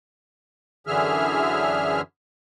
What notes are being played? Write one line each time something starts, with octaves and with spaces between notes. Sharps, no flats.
F#2 D3 E3 G#4 E5 F6